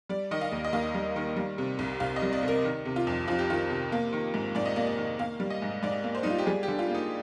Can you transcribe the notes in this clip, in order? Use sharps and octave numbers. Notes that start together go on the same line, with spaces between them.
G3 D5
D#3 D#5
F5
D#2
D#5
D#2 F5
G3
D#3
G3
C3
C2
C2 F5
D#5
G3
D5
C3
A#4
D#3
C3
F4
F2
F2 F4
G4
D#3 F4
C3
A#3
D#3
G#2
G#2 D5
D#5
A#3 D5
D5
D#3
A#3 F5
G3
D#5
G#2
G#2 D5
A#3
C5
G3 D#4
F4
G4
G3 G#4
G4
D3
F4
A#3 D#4